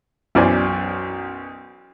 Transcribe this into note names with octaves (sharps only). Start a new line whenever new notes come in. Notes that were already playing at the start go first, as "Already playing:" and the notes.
B1 F#2 E3 C5 D5 G#5